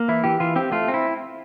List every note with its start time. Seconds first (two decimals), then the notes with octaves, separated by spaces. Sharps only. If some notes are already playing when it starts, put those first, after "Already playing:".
Already playing: A#3
0.08 E3 E4
0.24 E3 G4
0.40 E3 F4
0.56 C4 G4
0.72 A3 F4
0.88 C4
0.94 E4